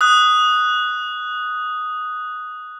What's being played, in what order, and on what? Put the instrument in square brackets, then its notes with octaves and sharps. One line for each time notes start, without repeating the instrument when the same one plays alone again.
[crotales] D#6 F#6